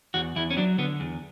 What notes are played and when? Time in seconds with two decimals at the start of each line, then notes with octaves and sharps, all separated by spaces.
0.14 E2 F#4
0.36 E2 E4
0.50 C#4
0.57 F#3 D4
0.78 D3 B3
1.00 E2